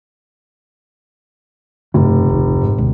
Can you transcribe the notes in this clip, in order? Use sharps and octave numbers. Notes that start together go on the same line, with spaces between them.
F1 G2 C#3 A3
D1 G#1
G#2
D2 B2 G#3